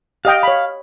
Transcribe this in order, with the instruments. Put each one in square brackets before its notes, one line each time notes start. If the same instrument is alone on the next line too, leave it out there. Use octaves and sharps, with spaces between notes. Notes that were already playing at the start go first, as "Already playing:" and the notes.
[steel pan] G4 D#5 G5 [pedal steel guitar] F5
[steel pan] C#5 B5